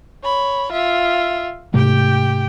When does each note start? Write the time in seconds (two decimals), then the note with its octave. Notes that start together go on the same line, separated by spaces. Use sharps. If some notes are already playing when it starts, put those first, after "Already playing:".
0.23 C#5 B5
0.72 F4 E5
1.74 G#2 C3 A3 G4 G5